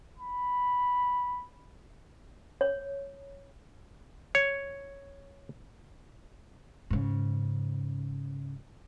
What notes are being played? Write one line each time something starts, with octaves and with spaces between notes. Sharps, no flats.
B5
C#5
C#5
G#2 C#3